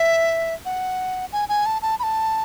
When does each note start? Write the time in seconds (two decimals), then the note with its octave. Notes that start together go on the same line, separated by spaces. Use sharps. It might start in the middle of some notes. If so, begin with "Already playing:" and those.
Already playing: E5
0.65 F#5
1.33 G#5
1.49 G#5
1.66 A5
1.82 A5
1.99 B5
2.03 A5